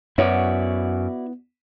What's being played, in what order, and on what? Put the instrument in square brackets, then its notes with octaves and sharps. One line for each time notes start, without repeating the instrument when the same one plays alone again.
[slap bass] F#2 [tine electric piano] B3 [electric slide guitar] E4 F#4 D5 [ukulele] C#5